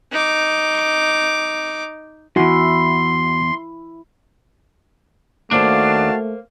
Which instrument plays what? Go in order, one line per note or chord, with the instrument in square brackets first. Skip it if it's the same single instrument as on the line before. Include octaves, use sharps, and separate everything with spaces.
[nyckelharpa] D#4 D6
[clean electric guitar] E2 G2 [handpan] E4 [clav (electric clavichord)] F#4 F#5 G#5 [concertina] C6
[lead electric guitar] D#2 D4 [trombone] A3 [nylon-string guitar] A#3 C5 [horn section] F#4 F5 A5